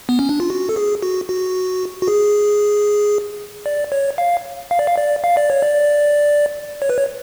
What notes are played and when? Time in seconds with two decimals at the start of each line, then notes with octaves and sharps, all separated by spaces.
0.09 B3
0.19 C#4
0.29 D4
0.40 F4
0.50 F#4
0.69 A4
0.76 G#4
1.03 F#4
1.29 F#4
2.02 F#4
2.08 G#4
3.66 D5
3.92 C#5
4.18 F5
4.71 F5
4.79 D5
4.87 F5
4.97 D5
5.24 F5
5.37 D5
5.50 C#5
5.63 D5
6.82 C#5
6.89 B4
6.98 C#5